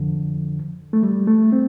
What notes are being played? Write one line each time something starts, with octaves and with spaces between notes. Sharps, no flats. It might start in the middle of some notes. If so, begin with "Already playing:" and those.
Already playing: F2 D3 F3
A3
G3
A3
C4